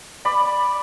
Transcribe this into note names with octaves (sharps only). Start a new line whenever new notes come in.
D5 B5